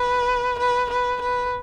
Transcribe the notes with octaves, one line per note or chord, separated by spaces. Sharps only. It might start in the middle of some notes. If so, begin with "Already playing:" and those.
Already playing: B4
B4
B4
B4